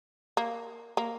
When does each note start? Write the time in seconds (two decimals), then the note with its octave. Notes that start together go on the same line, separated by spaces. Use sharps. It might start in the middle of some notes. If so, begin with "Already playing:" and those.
0.37 A#3
0.97 A#3